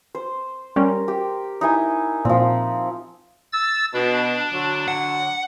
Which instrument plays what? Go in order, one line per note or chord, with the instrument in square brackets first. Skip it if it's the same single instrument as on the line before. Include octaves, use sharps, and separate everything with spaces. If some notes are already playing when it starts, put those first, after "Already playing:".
[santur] C5
[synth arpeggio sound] G3 C#4 [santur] A#4
[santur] G4
D#4 E4 G#5
[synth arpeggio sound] A#2 [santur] F3 C4
[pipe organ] E6 A6
[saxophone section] B2 [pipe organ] D4
[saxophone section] D3 F#3
[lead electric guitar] F#5